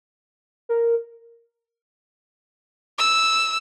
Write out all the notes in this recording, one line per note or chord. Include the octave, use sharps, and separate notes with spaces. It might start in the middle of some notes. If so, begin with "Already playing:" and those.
A#4
E6